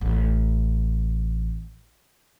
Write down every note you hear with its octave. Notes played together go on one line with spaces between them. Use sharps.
A1 D#4